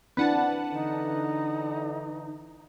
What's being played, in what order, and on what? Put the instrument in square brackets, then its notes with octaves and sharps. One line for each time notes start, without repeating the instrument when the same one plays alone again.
[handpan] C4 D4 E4 [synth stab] B4 F#5 A5
[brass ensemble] D3 E3 [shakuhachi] D#4